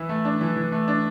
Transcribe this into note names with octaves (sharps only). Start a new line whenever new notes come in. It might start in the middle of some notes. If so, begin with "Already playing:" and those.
Already playing: E3 E4
A3
D4
E3
E3
A3
D4